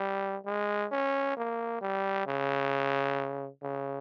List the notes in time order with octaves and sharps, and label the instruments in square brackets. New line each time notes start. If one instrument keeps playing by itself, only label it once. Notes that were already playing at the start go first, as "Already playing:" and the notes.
Already playing: [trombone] G3
G#3
C#4
A#3
G3
C#3
C#3